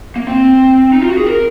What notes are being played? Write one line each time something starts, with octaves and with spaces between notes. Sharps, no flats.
A#3
C4
D#4
F4
F#4
G#4
A#4